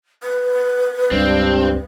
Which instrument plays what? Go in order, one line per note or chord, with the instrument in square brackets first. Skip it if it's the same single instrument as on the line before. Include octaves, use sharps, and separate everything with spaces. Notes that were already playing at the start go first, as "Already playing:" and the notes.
[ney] B4
[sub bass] C#2 [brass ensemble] G2 [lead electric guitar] C4